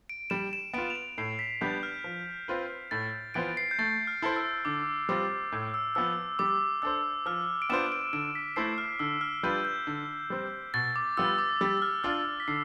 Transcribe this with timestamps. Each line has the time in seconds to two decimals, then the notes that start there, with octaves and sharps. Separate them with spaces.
0.09 D7
0.30 G3 E7
0.53 E7
0.74 B3 F4 D7
0.90 F7
0.95 E7
1.18 A2 C7
1.39 B6
1.61 G3 B3 D4 G6
1.83 F6
2.04 F3
2.48 C4 F4 B4
2.91 A2 A6
3.34 E3 B3 F4 C5 D7
3.57 C7
3.71 G6
3.78 A3 A6
4.07 F6
4.22 E4 A4 C5
4.37 E6
4.65 D3 D6
5.09 G3 C4 F4 D6
5.52 A2
5.74 E6
5.95 F3 B3 E6
6.39 G3 D6
6.82 D4 A4 C5 E6
7.26 F3 F6
7.62 D7
7.70 B3 D4 F4 C5 E7
7.92 D7
8.13 D3 D7
8.35 B6
8.56 A3 E4 A4 C5 C7
8.78 F6
8.99 D3 E6
9.21 F6
9.43 G3 D4 F4 B4 G6
9.65 G6
9.87 D3
10.30 G3 C4
10.74 B2 A6
10.96 D6
11.17 G3 B3 F4 E6
11.38 D6
11.61 G3
11.82 F6
12.04 D4 F4 E6
12.40 B6
12.48 D3 C7